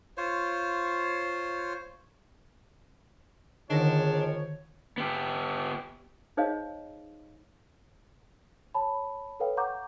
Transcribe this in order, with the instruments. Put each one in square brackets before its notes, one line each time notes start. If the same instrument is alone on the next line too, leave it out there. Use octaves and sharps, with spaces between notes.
[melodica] F4 C5 C#5
[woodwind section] D#2 G#2 [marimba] D3 D#3 A#6 [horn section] F3 C#5 [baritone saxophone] D4
[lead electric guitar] B3 G4
[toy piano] D#4 G#4 C5 C#5 D#5 F5
[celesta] C#5 A5 B5
A4 B4 C#5 F5 G5
F#5 A#5 C#6 D6 G6